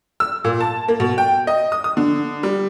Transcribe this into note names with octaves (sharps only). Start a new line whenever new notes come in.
E6
A#2
A5
A#3
B2
G5
D#5
D#6
D#6
D3
G3